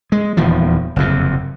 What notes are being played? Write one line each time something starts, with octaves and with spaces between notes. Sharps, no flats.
G#3
D#1 E2 D#3 F3
F#1 F2 C3